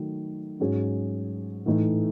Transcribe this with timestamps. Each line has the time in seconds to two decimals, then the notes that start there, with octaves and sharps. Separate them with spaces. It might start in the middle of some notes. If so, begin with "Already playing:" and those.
Already playing: D#3 F#3 A3
0.60 G#2 F#3 C#4 G#4
1.66 A2 E3 A3 D#4